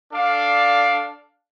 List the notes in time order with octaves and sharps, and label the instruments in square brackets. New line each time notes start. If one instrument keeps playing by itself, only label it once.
[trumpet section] D4 A4 D5 F5